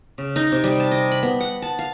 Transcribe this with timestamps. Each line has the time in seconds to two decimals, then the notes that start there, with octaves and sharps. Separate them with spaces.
0.18 C#3
0.36 D#4
0.52 C3
0.64 G3
0.80 A5
0.91 D#5
1.11 B5
1.23 B3
1.41 F#5
1.62 A5
1.79 F5